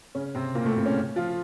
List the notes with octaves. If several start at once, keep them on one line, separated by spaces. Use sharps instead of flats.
C#3 C#4
C3 C4
A#2 A#3
A2 A3
C3 C4
C#3 C#4
F3 F4